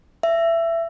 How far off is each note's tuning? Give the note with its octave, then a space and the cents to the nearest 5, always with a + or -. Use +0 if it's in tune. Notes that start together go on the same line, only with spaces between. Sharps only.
E5 +20